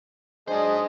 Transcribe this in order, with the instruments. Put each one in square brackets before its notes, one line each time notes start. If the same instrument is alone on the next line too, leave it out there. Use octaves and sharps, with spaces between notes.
[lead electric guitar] G#2 C5 [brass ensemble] F#3 D4 [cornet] G#4 [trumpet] D#5